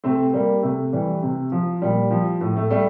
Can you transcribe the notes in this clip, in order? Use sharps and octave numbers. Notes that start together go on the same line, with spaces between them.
C3 A3 C4
G3 A#3
C3 A3
E3 G3
C3
F3
A#2 G3
F3
A2
A3
G3 A3